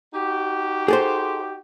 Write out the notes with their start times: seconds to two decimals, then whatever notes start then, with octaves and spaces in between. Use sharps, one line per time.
0.14 D#4 F#4 G4
0.88 G#4 A4 C5